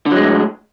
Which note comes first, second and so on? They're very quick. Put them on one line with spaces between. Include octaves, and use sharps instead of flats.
D3 F#3 G#3 A2